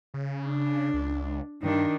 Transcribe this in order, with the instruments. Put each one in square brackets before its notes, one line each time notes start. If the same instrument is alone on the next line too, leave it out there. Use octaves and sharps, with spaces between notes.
[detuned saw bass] C#3
[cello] D4
[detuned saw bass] C#2
[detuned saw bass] G2 [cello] D#3 D4